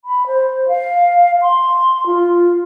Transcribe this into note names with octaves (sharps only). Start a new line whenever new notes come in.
B5
C5
F5
C6
F4